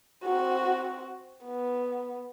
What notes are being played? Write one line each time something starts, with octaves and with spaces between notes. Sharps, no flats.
C4 F#4
B3